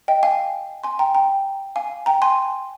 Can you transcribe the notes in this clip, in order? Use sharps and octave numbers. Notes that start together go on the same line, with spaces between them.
D#5 G5
F5 G#5
G#5 C6
G5 A#5
G5 A#5
F5 G#5
G5 A#5
G#5 C6